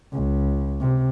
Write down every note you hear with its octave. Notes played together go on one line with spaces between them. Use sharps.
C#2
C3